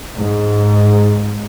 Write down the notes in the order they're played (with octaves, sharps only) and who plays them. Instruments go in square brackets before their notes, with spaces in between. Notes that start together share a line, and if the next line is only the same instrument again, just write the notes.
[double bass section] G#2